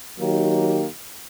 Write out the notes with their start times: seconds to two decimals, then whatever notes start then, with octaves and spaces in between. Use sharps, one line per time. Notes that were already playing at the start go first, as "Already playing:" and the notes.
0.19 D#3 F#3 A#3 D#4 G4